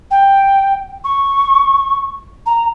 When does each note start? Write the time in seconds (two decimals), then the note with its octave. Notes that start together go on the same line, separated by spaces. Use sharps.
0.11 G5
1.04 C#6
2.46 A#5